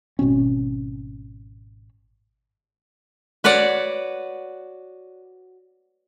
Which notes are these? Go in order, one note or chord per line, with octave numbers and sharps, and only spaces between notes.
G#1 B2 C4 C#4
F#4 B4 C#5 D5 F#5